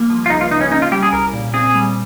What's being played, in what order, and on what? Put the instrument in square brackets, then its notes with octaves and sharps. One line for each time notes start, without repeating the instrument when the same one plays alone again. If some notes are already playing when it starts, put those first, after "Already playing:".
Already playing: [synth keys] G3 A#3
F3
[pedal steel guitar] F4
[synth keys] C#2 [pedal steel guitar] D#4
[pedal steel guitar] F4
[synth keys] C#3 [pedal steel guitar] D#4
[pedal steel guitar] C#4
[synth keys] C#4 [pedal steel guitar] D#4
[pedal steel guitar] F4
[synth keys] G3 [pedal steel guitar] G4
[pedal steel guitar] G#4
[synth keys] C2 [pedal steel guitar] A#4
[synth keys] A#2
[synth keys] C4 [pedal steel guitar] G#4
[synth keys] G3